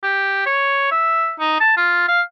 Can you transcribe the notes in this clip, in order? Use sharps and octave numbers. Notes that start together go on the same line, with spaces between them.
G4
C#5
E5
D#4
A5
F4
F5